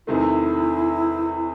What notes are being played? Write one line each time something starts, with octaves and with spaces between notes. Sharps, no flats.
E2 C3 D#3 A3 E4